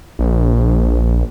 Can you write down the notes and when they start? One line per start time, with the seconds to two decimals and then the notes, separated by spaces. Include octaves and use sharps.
0.19 A#1